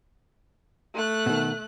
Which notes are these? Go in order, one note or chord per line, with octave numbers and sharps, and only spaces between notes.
A3 F#6
B2 D#3